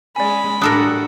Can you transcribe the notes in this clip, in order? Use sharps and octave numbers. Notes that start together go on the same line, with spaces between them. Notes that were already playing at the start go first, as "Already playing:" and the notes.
G#3 C#4 D5 G#5 B5
A2 G3 D4 F#4 A4 A#4 D#6 F#6